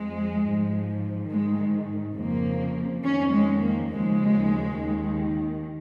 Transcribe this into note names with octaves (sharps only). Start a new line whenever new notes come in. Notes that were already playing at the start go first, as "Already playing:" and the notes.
Already playing: F2 F3 G#3
G#2 F3
G#2 D#3 G#3
F2 C#3 F3 A#3
F2 D#3 C#4
G#3
A#3
D#2 C#3 F3 G#3
D#2 D#3